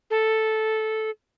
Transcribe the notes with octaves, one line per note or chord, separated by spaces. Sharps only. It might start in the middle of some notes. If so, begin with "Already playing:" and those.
A4